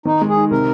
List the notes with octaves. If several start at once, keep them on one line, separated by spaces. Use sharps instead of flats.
D#3 D#4
G#3
G#4
D#4
C3 A#4